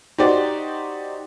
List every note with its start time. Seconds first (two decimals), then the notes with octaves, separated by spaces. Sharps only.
0.18 D#4 F#4 G4 C5 D5